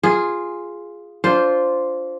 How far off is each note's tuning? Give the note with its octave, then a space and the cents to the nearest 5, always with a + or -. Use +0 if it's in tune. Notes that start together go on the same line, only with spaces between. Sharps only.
F4 +0 G#4 -5
D4 -20 F4 +0 C5 +0